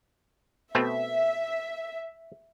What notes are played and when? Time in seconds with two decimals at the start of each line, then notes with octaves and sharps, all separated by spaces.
0.75 B2 A3 C4 E5